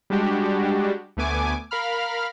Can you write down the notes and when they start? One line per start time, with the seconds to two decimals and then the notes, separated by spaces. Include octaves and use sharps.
0.10 G3 G#3 D4 F#4 G4
1.17 D2 A3 B3 G#5 D6
1.71 A#4 F5 B5 F6